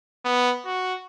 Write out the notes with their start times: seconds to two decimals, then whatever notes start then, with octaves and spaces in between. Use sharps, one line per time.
0.25 B3
0.65 F#4